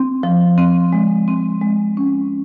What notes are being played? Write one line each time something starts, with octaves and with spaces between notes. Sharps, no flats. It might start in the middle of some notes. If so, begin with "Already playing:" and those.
Already playing: C4
F3
C4
G#3
C4
G#3
C#4